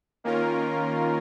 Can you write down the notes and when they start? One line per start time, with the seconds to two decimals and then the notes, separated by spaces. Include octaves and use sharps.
0.24 D#3 A#3 C#4 F4 A#4